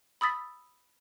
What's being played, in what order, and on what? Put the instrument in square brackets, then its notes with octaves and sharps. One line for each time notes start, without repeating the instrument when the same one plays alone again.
[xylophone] B5 D#6 E6 A6 B6